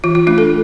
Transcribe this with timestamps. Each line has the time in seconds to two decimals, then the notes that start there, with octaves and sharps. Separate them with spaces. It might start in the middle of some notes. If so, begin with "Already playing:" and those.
0.04 E3 F4
0.15 F4
0.27 A3 D4 F4
0.38 A4